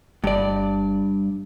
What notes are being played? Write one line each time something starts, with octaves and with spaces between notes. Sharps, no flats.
G1 G2 D5